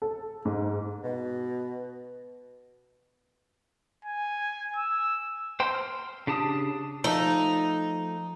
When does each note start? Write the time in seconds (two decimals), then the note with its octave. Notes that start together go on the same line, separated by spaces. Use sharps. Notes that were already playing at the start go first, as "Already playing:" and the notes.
0.02 A4
0.45 G#2
1.03 B2
4.05 G#5
4.76 E6
5.60 C5 G5 C6
5.74 F6
6.27 C#3 D4 G4 A5 D#6
7.04 F3 A3 D#4 A4